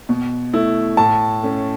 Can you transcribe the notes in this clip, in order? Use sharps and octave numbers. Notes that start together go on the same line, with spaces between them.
B2
A3 E4
A2 A5
A3 C#4